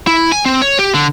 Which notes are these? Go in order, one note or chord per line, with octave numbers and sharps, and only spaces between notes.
E4
G#5
C4
C#5
G4
D3